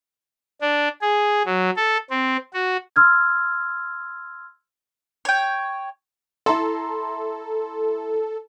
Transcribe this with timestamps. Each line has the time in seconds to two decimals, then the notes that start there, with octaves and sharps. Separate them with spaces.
0.61 D4
1.02 G#4
1.45 F#3
1.76 A4
2.10 C4
2.53 F#4
2.96 C6 E6 F6 G#6
5.25 C#5 G5
6.46 E4 A4 A#5 C6